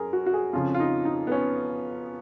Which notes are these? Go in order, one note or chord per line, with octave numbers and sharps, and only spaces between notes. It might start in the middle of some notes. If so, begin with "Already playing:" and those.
Already playing: F#2 G#4 A#4
F#4
F#4
G#4
F2 C#3 F3 F4
F4
D#4
D#4
B3
C#4